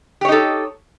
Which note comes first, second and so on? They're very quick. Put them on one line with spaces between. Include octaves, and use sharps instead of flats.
G4 C#5 D#4 A4